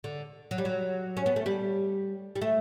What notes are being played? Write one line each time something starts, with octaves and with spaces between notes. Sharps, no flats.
D3
F#3
G3
F#3
C#4
B3
A3
G3
G3
A3